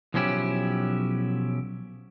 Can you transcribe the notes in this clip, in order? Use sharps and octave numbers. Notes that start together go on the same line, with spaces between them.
B1 F3 F#3 C#4 E4 G4